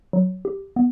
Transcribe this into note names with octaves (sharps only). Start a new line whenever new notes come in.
F#3
G4
B3